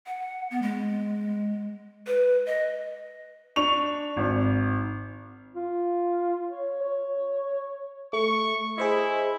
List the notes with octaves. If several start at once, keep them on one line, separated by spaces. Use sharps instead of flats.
F#5
B3
G#3
B4
D#5
D4 C#6 F7
G#1
F4
C#5
C#5
A3 C#6
E4 G#4 C5 D#5